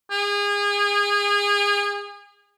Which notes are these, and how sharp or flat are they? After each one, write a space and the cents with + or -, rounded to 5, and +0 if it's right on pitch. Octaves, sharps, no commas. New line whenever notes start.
G#4 -30